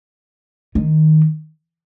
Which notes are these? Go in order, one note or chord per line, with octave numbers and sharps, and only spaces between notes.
D#3